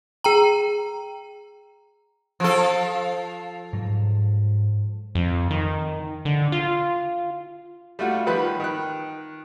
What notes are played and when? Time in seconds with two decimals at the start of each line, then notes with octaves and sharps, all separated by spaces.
0.24 G#4 G5 A#5
2.40 F3 A4
3.73 G#2 F#3
5.15 F2
5.51 D#3
6.25 D3
6.52 F4
7.99 G3 A3 F4 F#4
8.26 D#3 F3 G3 B4 B5 F#6
8.60 D#3 F#6